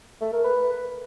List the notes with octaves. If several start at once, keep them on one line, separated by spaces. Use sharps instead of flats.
A3
A#4
B4